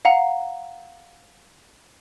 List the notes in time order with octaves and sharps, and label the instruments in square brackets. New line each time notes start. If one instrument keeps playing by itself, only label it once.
[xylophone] F5 F#5 A#5